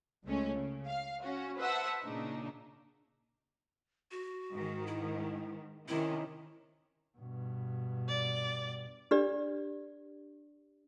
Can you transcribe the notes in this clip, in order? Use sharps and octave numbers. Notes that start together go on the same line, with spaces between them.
C#2 G#3 A3 C#4
C#3
F5
C#4 F#4
B4 C5 E5 F#5 A5
A#2 C#3 D4 D#4
F#4
G#2 D#3
E4
C3 D#3 C#4 E4
G2 B2
D5
D4 G4 D5